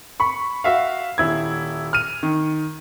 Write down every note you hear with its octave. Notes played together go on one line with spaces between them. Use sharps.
B5 C#6
F#4 E5 F5
D#1 E4 G#6
F6 D#7
D#3